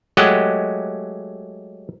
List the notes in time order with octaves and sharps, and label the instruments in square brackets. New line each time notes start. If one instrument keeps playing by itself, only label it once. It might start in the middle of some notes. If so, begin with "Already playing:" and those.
[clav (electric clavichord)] F#3 G#3 A3 G4 D#5 F#5